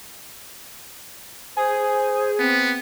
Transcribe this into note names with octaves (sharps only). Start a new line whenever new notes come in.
G#4 C5
B3 C4